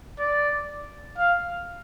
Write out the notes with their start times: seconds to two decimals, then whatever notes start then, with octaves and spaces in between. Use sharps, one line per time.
0.19 D5
1.18 F5